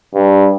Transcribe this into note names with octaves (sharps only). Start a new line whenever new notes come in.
G2